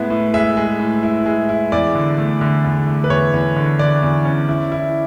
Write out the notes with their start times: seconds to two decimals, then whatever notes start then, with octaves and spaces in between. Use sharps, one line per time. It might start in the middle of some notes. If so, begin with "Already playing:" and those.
Already playing: A2 G#3 B3 E4
0.10 A2
0.34 G#3 E5
0.57 G#3
0.80 A2
1.03 E4
1.26 G#3
1.49 E4
1.72 E2 D5
1.95 D3
2.18 A3
2.41 D3
2.64 E2
2.87 A3
3.04 B4
3.10 E2 C#5
3.34 E2
3.56 D3
3.79 D3 D5
4.03 E2
4.25 C#4
4.49 E4
4.72 E4